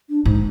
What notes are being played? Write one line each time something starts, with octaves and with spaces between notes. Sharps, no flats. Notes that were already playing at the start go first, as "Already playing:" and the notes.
D4
G#2 D#4